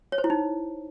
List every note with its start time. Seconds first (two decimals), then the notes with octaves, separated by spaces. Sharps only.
0.12 C#5
0.18 C5
0.24 E4
0.30 D#4